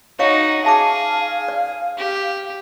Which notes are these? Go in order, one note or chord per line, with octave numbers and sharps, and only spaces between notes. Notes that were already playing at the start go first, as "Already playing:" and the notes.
D#4 F#4 C#5 D#5 F5
G#4 E5 F5 A5 D6
D5
G4